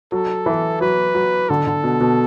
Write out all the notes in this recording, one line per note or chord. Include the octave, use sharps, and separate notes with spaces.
F#3 A4
E3
F#3 B4
F#3
D3 A4
D3
B2
B2